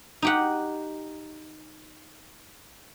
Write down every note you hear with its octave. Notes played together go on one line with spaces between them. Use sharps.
D#4 G4 F#5